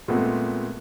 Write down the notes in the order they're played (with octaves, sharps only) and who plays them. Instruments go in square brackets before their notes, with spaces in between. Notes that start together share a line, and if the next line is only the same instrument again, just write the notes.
[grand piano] A#2 G#3 A3 B3 C4